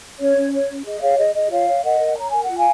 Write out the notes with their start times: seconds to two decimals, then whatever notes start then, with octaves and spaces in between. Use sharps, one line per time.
0.20 C#4 C#5
0.36 C#4
0.53 C#5
0.69 C#4
0.85 G#4 D#5
1.01 G#4 C#5 F5
1.18 G#4 D#5
1.34 G#4 D#5
1.51 F4 C#5 F5
1.68 C#5
1.83 A#4 D#5 F#5
1.99 A#4
2.16 C#5 A#5
2.30 A#4 G#5
2.43 F#5
2.49 F4
2.57 F5 G#5